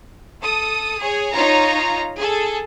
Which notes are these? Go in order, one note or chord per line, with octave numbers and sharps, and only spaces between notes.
A4 D#6
G#4 C#5
D#4 F4 C#5 F5 A#5
G#4 A4